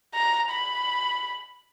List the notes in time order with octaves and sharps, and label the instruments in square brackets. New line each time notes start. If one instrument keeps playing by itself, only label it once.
[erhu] A#5
B5